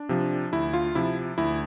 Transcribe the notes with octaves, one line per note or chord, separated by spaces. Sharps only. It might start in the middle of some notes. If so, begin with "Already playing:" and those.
Already playing: D4
C3 F3
D2 E4
F4
C3 F3 E4
D2 E4